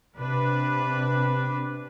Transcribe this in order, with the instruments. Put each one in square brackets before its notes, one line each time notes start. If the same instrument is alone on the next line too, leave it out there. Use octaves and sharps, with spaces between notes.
[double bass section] C3 [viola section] D4 B4